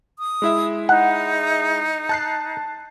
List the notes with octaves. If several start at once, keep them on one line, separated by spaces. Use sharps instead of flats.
D#6
G#3 E4 E5
D#4 F#5
A5 F#6 C7